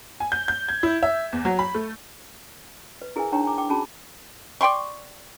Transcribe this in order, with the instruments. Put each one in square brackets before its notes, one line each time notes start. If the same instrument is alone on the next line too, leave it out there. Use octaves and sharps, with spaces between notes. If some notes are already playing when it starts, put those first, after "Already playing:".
[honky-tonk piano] G#5
G6
G6
G#6
E4
E5
E2
F#3
B5
A3
[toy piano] B4 D#5
E4 G#4 A#4 B4 E5 G#5
D4 D#4 C#5 G5 A#5 C#6
G#5 A#5 D6
G5 C6 D6
C#4 F#4 G#4 A5 B5
[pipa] D5 G5 C6 C#6